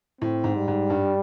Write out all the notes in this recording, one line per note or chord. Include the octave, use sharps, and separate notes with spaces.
A2 C4
G#2
G3
G#2
G2